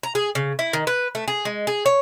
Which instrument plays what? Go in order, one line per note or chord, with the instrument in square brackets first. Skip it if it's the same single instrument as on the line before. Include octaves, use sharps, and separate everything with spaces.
[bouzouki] A#5
G#4
C#3
E4
D#3
B4
A3
G#4
G#3
G#4
C#5